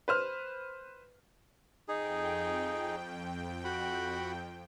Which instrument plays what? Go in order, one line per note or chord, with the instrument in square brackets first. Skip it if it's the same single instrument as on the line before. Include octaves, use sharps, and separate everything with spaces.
[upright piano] B4 C5 F6
[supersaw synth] F2 G5 [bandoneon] D#4 G#4
[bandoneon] F#4 F#5 B5